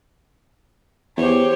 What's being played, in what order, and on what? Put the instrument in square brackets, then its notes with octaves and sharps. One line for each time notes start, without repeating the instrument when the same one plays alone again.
[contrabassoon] E2 [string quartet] G4 C5 C#5